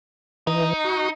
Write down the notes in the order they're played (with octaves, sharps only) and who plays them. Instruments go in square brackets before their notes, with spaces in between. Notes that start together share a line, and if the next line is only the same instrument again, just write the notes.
[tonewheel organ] E3 [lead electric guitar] D#4
[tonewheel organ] F#4